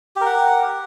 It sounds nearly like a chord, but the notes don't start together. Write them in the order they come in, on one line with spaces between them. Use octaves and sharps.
G4 A#4 F#5